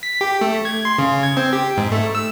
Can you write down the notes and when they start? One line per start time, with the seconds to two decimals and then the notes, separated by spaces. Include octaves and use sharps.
0.03 B6
0.21 G4
0.41 A3
0.65 G#6
0.85 C6
0.99 C#3
1.23 G#6
1.37 C4
1.53 G4
1.77 G#2
1.92 A3
2.15 E6